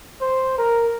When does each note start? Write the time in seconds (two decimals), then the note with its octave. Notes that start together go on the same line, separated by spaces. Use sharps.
0.21 C5
0.58 A#4